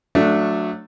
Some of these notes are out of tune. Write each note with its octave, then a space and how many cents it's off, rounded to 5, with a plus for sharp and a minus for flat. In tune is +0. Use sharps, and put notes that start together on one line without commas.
F#3 -25 A3 +0 D4 +0